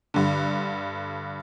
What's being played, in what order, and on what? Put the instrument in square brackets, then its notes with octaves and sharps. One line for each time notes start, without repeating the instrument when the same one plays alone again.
[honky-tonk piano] G2 D3